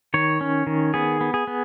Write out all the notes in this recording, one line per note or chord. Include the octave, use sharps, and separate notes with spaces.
D#3 C#5
C#4
D#3
B3 G#4
B3
G#4
B3